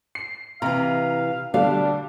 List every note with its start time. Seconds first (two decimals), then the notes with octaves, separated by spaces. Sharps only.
0.15 C7
0.62 C3 E3 F5 A#5
1.54 B2 D3 G3 D4 F5